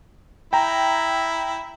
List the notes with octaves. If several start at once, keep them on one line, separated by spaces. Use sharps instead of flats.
E4 G5 A#5